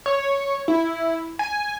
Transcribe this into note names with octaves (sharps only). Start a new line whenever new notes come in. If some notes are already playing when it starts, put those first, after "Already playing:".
C#5
E4
G#5